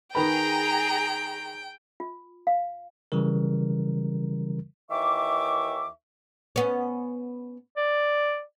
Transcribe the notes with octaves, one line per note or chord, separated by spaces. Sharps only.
D#3 G#4 B4 G5 A#5 B5
F4
F5
C#3 E3 G3 A#4
D#2 D#3 E3 E5 C#6 D6
B3 C#4
D5